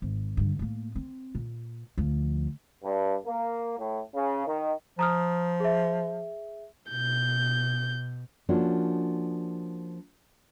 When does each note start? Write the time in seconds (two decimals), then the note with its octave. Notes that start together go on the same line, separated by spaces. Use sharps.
0.02 G#1
0.37 G2 D3
0.59 A2 A#3
0.95 C4
1.35 A#2
1.98 D2 F3
2.83 G2
3.26 A#3
3.78 A2
4.15 C#3
4.47 D#3
4.99 F3 A#5 D#6 F6
5.60 G#4 E5
6.90 B2 G6
8.49 F3 A#3 C#4 D4 F#4